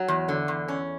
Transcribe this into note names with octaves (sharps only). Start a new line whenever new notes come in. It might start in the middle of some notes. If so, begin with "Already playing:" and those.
Already playing: F#3
E2
D3
E2
C#4